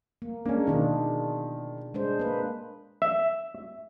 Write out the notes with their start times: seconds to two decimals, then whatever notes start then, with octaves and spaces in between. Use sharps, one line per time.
0.22 A#3
0.46 G#3 A#3 C#4 D4
0.67 B2 D#3 D4 F4
1.94 G#3 D4 C5
2.19 A#3 B4
3.02 E5